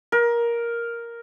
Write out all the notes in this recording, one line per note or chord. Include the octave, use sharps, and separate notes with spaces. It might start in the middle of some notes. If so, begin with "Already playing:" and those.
A#4